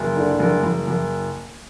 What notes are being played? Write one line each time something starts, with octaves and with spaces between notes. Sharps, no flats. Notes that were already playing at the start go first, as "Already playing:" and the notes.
Already playing: F#1
D3
F#1
F#1
F#1